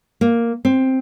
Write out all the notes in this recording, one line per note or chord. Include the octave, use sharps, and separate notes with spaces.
A#3
C4